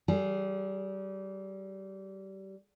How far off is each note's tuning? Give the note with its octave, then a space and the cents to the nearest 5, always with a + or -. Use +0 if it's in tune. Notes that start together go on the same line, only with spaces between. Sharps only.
G3 -25 G#4 +0